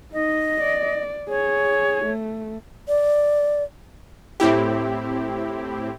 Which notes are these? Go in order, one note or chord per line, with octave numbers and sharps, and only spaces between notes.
D#4 D#5
D5
G#4 C#5
A3
D5
A2 C4 E4 G4